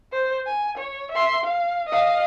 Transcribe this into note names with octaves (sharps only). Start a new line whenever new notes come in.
C5
G#5
C#5
E5 C6
F5
D#5 F5